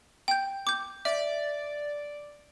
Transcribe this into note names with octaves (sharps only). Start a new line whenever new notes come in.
G5 G6
D6 G6
D5 E5